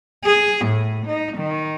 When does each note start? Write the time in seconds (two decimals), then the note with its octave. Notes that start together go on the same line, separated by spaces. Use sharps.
0.25 G#4
0.65 A2
1.06 D#4
1.37 D#3